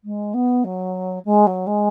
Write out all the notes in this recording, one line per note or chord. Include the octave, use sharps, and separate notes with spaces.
G#3
B3
F#3
G#3
F#3
G#3